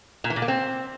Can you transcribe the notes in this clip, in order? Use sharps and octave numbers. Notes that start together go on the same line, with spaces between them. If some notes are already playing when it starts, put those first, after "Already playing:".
A#2
E3
A#2
A#3
C4